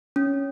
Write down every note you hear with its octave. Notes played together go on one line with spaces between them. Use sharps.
C#4